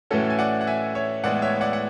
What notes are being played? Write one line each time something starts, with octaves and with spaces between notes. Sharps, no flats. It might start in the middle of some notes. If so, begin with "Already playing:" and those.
A2 E3 A3 C#4 F#4 A4
G#5
D5 F#5
F#5
E5 G#5
C#5 E5
A2 E3 G#3 B3 D5 F#5
C#5 E5
D5 F#5
F#5